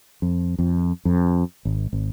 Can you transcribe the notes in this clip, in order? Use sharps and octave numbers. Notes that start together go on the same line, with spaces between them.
F2
F2
F2
G#1
G#1